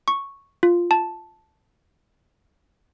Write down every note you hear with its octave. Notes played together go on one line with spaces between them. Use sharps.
C#6
F4
A5